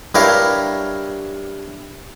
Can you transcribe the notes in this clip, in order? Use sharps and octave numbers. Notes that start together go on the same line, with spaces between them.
G2 E4 G4 A#4 C#5 F5